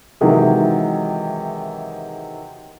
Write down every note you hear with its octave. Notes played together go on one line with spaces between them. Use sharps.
C3 D#3 E3 F#3 G#3 G#4